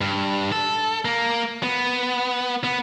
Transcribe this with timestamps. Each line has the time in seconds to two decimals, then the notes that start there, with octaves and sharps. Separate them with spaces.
0.01 G2
0.52 A4
1.05 A#3
1.63 B3
2.64 B3